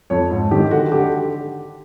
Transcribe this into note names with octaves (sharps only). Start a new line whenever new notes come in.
F2 C#5
G#2
D#3 G4
D3 F#4
D3 G4